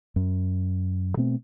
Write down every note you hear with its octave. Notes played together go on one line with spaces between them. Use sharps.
F#2
B2 A3 C4